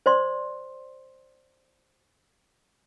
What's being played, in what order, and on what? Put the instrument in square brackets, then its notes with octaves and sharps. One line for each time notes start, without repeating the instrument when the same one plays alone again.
[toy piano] C5 D5 C6